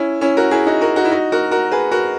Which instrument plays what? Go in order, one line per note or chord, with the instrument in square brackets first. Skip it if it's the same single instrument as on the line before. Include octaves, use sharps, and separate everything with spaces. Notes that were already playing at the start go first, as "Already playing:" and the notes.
Already playing: [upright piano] C#4 E4
C#4 E4
F#4 A#4
E4 G#4
D#4 F#4
F#4 A#4
D#4 F#4
E4
D#4 F#4
F#4 A#4
F#4 A#4
G#4 B4
F#4 A#4